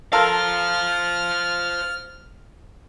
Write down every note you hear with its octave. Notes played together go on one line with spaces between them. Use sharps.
F4 A4 A#4 C5 F5 F6